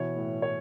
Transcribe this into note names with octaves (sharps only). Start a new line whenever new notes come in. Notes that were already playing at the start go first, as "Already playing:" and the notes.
Already playing: B2 E3 C#5
A2
A2 C#5